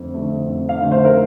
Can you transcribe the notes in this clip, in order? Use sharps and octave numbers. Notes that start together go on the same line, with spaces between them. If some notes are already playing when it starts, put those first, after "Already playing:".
Already playing: F2 D3 A3
D3 A3
F2
F5
D3 A3
C5
A#4